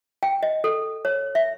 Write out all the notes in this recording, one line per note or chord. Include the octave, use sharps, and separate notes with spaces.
G5
D#5
A4
C#5
E5